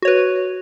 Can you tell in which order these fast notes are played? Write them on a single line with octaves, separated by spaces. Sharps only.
F#4 C#5 B4